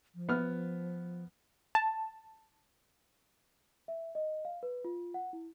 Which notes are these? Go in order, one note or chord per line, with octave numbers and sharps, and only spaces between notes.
F3
B3 F6
A5
E5
D#5
F5
B4
F4
F#5
E4